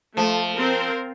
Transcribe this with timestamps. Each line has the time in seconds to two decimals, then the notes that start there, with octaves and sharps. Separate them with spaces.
0.17 F3 A3
0.58 C4 A#4 C5